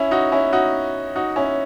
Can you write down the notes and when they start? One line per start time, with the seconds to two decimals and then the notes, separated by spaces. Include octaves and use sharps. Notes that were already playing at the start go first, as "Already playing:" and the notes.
Already playing: C#4 E4
0.11 D#4 F#4
0.32 C#4 E4
0.53 D#4 F#4
1.16 D#4 F#4
1.36 C#4 E4